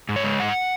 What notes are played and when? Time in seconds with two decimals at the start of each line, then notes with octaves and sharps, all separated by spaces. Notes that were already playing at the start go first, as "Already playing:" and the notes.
0.09 G#2
0.16 C#5
0.24 G#3
0.40 G#2 F#5